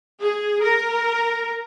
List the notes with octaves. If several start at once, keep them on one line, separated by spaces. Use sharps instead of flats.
G#4
A#4